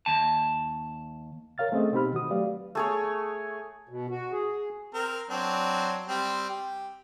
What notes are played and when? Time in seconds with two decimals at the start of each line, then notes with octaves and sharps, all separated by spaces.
0.06 D#2 A5
1.58 A#4 C#5 F5 F6 A6
1.72 A3 C4 C#4 G#4 A4 D#5
1.92 B2 C4 D#4 G4 B5 F6
2.13 D#3 F#4 D#6
2.30 F#3 A3 G4 B4 D5 F5
2.75 A3 G#4 C#5
3.89 B2
4.10 F#4
4.32 G#4
4.94 C4 A#4
5.30 F#3 C4 D4
6.08 G3 C4
6.49 G4